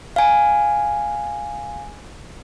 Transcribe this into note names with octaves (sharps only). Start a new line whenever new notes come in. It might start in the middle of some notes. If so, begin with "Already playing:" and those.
F5 G#5